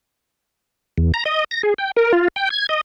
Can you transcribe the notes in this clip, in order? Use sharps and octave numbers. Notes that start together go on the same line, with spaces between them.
E2
A#5
D#5
A#6
G#4
G5
A#4
F4
G5
G#6
D#5